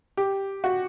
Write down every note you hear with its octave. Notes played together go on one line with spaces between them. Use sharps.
G4
F#4